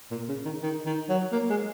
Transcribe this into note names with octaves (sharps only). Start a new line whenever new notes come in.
A#2
C#3
D#3
D#3
D#3
F#3
A#3
G#3